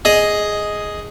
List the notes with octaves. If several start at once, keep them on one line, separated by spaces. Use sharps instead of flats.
G#4 D#5